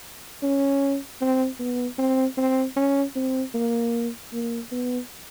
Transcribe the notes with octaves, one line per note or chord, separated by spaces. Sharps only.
C#4
C4
B3
C4
C4
C#4
C4
A#3
A#3
B3